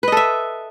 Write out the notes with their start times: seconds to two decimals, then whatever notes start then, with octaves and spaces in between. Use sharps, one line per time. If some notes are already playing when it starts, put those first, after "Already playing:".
0.03 B4
0.08 D#5
0.12 A4
0.17 E5